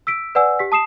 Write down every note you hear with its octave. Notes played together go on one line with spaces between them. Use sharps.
E6 B6 D7
B4 D5 F#5 G#5 E6
G4 B6
A5 D#6 C7 E7